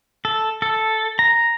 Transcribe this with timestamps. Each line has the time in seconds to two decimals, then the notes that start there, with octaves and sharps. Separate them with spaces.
0.25 A4
0.62 A4
1.19 A#5